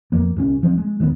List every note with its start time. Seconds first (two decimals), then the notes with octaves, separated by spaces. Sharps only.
0.12 F2 F3 A#3
0.36 C2 E3 C#4
0.62 D#2 F3 F#3 C4
0.77 G#3
1.00 D#2 D#3 A3 B3